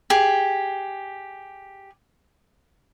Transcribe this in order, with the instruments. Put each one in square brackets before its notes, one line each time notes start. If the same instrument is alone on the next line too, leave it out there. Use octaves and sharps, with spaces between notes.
[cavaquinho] G4 G#4